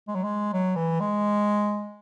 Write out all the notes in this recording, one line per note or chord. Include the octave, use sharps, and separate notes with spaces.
G#3
F#3
G#3
F#3
E3
G#3